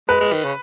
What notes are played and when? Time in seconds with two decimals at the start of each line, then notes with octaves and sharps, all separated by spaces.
0.08 G#3 B4
0.20 G#3
0.33 D#3
0.44 C#3